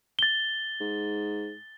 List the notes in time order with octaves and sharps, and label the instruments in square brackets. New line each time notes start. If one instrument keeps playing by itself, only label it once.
[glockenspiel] A6 G7
[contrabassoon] G#2